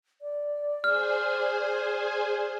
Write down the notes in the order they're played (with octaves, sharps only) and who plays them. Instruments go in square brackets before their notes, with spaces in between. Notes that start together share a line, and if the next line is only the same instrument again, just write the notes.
[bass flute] D5
[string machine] G#4 C5 G#5 [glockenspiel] F6